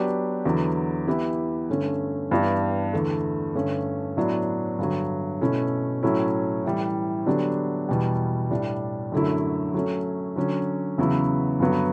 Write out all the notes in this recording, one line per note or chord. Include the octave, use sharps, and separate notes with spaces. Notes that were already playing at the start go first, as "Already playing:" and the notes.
Already playing: F#3 B3 D4 G4 B4
E2 D3 F#3 B3
E3 B3 E4 G4 B4
G2 D3 A3 C#4
G2 E3 B3 D4 G4
E2 D3 A3
G2 D3 A3 C#4
A2 F#3 B3 D4
G2 D3 F#3
B2 A3 C#4 E4
A2 F#3 A3 C#4 E4
A2 E3 G3
D3 F#3 B3 D4 G4
E2 B2 G3
A2 G3 D4
F#2 D3 F#3 A3 E4
F#3 A3 C#4
D3 F#3 C#4
E2 C#3 F#3 B3 E4
G2 D3 F#3 B3